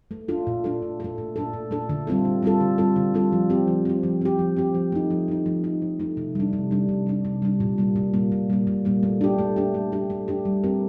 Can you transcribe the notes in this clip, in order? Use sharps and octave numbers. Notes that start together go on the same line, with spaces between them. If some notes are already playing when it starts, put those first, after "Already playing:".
A3
D4 F4 A4
A#2
A3 D4 A4
A#2
A3 D4 A4
A#2
A3 D4 A4
A#2
A3 D4 A4
D3
G3 C4 F4 A4
D3
G3 C4 F4 A4
D3
G3 C4 F4 A4
D3
G3 C4 F4 A4
F3
C4 G4
F3
C4 G4
F3
C4 G4
F3
C4 G4
F3
A3 D#4
F3
A3 D#4
F3
A3 D#4
F3
A3 D#4
C3
G3 D4
C3
G3 D4
C3
G3 D4
C3
G3 D4
A#2
G3 A#3
A#2
G3 A#3
A#2
G3 A#3
A#2
G3 A#3
A3
D4 G4
A3
D4 G4
A3
D4 G4
A3
D4 G4
G3
C4 G4 A#4